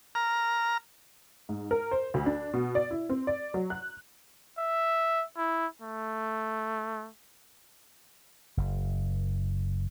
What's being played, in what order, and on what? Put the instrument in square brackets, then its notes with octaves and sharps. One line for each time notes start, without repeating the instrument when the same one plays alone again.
[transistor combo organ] A#5 F6
[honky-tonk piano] G#2
A#4
C5
D2
D4
B2
D5
E4
C4
D5
F#3
F#6
[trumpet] E5
E4
A3
[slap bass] F#1